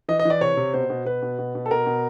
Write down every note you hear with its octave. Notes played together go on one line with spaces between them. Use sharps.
E3 D#5
D#5
E3 D5
C3 C#5
C3
B2 C5
B2
B2 B4
B2
B2
B2
A4
B2 A#4
B2